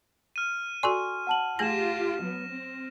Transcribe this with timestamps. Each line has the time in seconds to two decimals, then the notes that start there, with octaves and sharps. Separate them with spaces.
0.36 F6 D#7
0.83 F#4 A4 D5 G#5 C6 C#6
1.27 F#5 A5 F#7
1.59 A3 F4 G4 G#4 G#5 A#6 E7
2.21 F#3 B3
2.51 C4